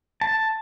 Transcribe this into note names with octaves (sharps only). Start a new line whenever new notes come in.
A5